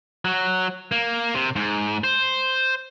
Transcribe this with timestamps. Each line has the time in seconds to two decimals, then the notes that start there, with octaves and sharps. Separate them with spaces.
0.25 F#3
0.92 A#3
1.34 C3
1.56 G#2
2.04 C5